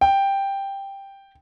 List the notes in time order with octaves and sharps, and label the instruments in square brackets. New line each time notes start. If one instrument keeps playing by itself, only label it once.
[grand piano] G5